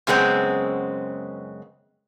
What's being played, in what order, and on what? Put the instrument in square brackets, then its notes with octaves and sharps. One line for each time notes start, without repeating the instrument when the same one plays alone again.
[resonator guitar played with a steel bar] F#2 C#3 G#3 B3 C4